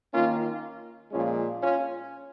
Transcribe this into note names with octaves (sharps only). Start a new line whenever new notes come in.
D#3 A#3 C#4 F4
A#2 F3 G#3 C#4 F4
C#4 F4